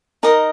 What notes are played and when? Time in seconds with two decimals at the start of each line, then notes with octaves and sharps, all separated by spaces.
0.23 D#4 A#4 D#5